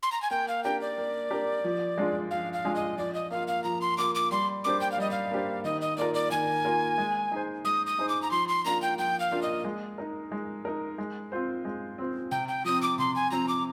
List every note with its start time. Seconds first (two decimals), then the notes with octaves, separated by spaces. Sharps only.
0.03 C6
0.12 A#5
0.22 G#5
0.31 A#3 G5
0.48 F5
0.64 D4 G4 A#4 G5
0.81 D5
0.98 A#3
1.30 D4 G4 A#4
1.64 F3
1.98 G#3 D4 F4 G#4
2.31 F3 F5
2.53 F5
2.64 G#3 D4 F4 G#4
2.75 D#5
2.98 F3 D5
3.14 D#5
3.31 A#3 F4 F5
3.48 F5
3.64 F3 A#5
3.81 C6
3.98 A#3 F4 D6
4.15 D6
4.31 G3 C6
4.64 A#3 D4 G4 C5 D6
4.81 G5
4.92 F5
4.98 G3 D#5
5.11 F5
5.31 A#3 D4 G4 C5
5.64 D#3 D#5
5.81 D#5
5.98 A#3 F4 A#4 D5
6.14 D5
6.31 D#3 G#5
6.65 A#3 F4 A#4
6.98 G#3
7.31 D#4 G#4 C5
7.65 G#3 D#6
7.86 D#6
7.99 D#4 G#4 C5
8.09 D6
8.22 A#5
8.31 F3 C6
8.48 C6
8.65 A#3 D4 F4 A#5
8.82 G5
8.98 F3 G5
9.20 F5
9.31 A#3 D4 F4
9.42 D#5
9.65 G#3
9.98 D#4 A#4
10.32 G#3
10.65 D#4 A#4
10.98 G#3
11.32 C4 F4 C5
11.65 G#3
11.98 C4 F4 C5
12.31 C3 G5
12.48 G5
12.65 F3 C4 D#6
12.82 D6
12.99 C3 C6
13.16 G#5
13.31 F3 C4 A#5
13.48 D6